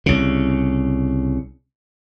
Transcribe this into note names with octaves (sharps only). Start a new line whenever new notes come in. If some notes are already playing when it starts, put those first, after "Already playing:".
C2 C#3